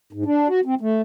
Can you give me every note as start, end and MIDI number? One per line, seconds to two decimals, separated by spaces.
0.13 0.24 44
0.26 0.48 62
0.48 0.60 66
0.65 0.75 60
0.81 1.02 57